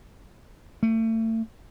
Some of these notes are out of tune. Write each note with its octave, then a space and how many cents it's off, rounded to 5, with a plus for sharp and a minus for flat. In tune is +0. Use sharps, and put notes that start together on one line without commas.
A3 +35